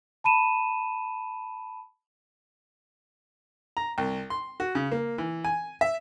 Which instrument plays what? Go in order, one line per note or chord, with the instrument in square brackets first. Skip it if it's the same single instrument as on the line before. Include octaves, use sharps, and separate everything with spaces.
[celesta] A5 B5 D#7 E7
[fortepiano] A#5
C2
C6
F#4
C#3
A#3
E3
G#5
E5